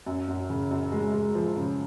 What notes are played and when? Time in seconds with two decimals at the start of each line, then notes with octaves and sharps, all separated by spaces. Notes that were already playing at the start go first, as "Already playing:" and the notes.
0.06 F#2
0.28 F#2
0.50 C#3
0.71 F#2
0.92 G#3
1.13 G#3
1.35 F3
1.56 C#3